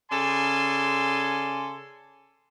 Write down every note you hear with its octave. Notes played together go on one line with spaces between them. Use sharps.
C#3 A4 D5 G#5 C6